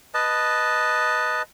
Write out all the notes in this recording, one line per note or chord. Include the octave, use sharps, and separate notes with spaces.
B4 D#5 A5